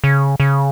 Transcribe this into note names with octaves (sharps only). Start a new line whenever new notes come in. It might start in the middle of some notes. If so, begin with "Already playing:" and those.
C#3
C#3